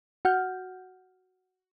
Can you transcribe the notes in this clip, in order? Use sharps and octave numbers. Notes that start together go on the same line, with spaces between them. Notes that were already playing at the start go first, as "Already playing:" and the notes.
F#4 F#5 F6 G6